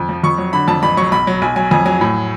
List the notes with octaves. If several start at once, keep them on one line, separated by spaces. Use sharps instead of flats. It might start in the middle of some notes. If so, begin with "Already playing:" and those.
Already playing: F2
F3
F2 C#6
F#3
D3 B5
F2 A5
A1 B5
F#3 C#6
B1 B5
F#3
B1 G#5
F#3 G#5
F2 G#5
F#3 G#5
A2